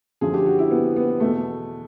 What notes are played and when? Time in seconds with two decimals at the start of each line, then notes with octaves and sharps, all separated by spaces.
0.21 F#2 D3 F3 G#4
0.34 G4
0.46 F#4
0.59 E4
0.71 B3
0.96 B3
1.20 E2 B2 A3